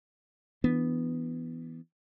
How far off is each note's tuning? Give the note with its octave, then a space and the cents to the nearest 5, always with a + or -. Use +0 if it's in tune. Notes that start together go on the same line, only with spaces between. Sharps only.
E3 +0 B3 +0 D4 +0